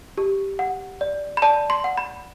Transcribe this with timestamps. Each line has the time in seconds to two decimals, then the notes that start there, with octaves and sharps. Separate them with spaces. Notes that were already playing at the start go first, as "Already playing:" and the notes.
0.18 G4
0.59 F#5
1.01 D5
1.37 B5
1.42 D5 A5
1.70 C6
1.84 F#5
1.98 B5